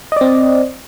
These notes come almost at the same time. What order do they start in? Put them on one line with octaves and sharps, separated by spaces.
D#5 D5 C4